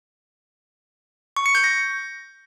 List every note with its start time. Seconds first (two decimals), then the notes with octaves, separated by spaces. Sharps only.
1.37 C#6
1.46 C#7
1.55 G6
1.64 A#6